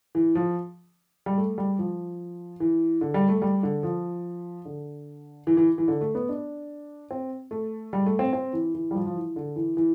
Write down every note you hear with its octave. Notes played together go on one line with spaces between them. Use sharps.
E3
F3
G3
A3
G3
F3
E3
D3
G3
A3
G3
D3
F3
D3
E3
E3
E3
D3
A3
B3
D4
C4
A3
G3
A3
C4
C4
E3
E3
G3
F3
F3
E3
D3
E3
E3